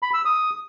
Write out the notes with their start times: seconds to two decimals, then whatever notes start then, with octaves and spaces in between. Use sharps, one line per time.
0.02 B5
0.14 E6
0.25 D#6